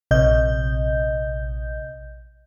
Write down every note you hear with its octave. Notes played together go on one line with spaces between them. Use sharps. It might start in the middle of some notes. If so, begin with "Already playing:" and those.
A#1 C3 D#5 G6